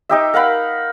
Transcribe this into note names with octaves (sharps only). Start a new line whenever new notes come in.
D#4 G4 E5
A#4 F5 F#5 B5